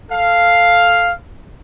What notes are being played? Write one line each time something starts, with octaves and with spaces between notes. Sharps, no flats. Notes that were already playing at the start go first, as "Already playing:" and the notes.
A4 F5